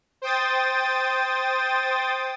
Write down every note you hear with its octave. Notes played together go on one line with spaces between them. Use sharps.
C5 G5 D#6 A6